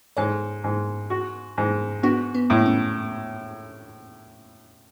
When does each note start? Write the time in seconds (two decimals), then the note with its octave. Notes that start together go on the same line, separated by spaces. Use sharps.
0.17 G#2 A4 C#5
0.64 G#2
1.10 F#4
1.58 G#2
2.03 B3 D4 F#4
2.35 B3
2.50 A2
2.66 C#4